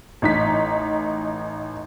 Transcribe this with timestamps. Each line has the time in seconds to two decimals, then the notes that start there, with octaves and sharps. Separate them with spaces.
0.22 A1 D#4 B6